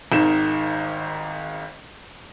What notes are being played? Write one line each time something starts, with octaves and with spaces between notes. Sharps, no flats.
G#1 G#2 D#3 E7